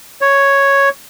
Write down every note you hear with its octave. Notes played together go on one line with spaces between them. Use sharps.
C#5